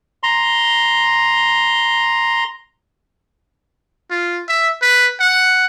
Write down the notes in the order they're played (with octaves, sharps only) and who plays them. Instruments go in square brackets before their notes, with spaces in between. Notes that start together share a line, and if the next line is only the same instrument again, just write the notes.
[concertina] A#5 C6
[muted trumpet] F4
E5
B4
F#5